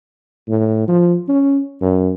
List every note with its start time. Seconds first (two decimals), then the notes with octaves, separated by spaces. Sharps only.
0.49 A2
0.87 F3
1.28 C#4
1.81 F#2